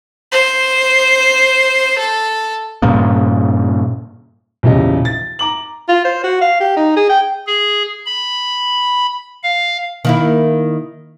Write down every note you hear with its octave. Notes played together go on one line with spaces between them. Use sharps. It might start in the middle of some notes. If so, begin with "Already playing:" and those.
C5
A4
G2 A#2 C#3
A#1 E2 C#3 G4 D#5
A6
A#5 D6 F#7
F4
C5
F#4
F5
G4
D#4
G#4
G5
G#4
B5
F5
D#3 A#3 E4